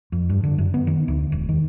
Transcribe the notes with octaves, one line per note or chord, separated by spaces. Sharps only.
F2
G2
D3
F#2
B3
D#3
D2
E1
D#3